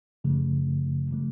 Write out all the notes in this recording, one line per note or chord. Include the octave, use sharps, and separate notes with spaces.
F#2 C#3 F3 A3
C#3 F3 A3